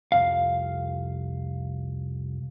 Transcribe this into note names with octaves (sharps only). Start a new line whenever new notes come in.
C2 F2 F5